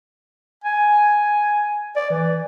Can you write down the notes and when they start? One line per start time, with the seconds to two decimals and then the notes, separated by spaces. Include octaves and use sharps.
0.64 G#5
1.96 D5
2.10 E3